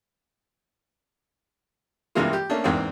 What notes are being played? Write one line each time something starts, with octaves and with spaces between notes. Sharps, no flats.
G2 C3 E3 G#3 A#3 F4
G4
A3 A#3 C#4 D4
E2 G#2 A#3 C4 D4